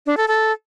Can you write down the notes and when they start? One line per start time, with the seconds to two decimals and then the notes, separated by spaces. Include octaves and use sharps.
0.06 D4
0.17 A4
0.28 A4